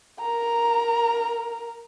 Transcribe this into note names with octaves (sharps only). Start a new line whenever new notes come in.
A#4 A#5